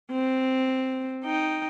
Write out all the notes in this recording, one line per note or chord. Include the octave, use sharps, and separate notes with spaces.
C4
D#4 G5